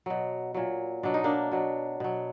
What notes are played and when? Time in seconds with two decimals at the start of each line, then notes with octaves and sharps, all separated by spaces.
0.06 B2 F#3
0.54 A#2 F#3
1.03 B2 F#3 D4
1.14 D#4
1.24 A#3 D4
1.52 B2 F#3
2.00 B2 F#3